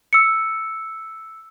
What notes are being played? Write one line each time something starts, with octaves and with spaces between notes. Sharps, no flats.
E6 C#7